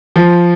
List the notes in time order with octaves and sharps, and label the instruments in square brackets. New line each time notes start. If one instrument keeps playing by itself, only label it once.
[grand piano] F3